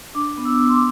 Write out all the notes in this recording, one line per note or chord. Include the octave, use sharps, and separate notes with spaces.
D4 D6
B3
E6
B3
C6
D6